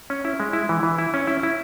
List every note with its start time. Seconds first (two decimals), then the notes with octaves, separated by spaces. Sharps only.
0.10 C#4
0.25 E4
0.40 G#3
0.53 E4
0.69 E3
0.83 E3
0.98 E4
1.14 C#4
1.27 E4
1.43 E4